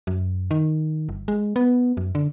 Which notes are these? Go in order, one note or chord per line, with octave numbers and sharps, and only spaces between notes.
F#2
D#3
G1
G#3
B3
F#2
D3